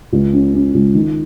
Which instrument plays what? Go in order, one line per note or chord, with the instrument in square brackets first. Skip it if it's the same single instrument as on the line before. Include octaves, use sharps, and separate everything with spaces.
[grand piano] C#2
C#4
C#4
C#2
D#3